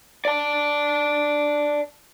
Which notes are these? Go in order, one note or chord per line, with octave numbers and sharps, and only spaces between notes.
D5 A5